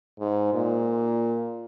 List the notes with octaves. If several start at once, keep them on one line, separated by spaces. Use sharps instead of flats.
G#2
A#2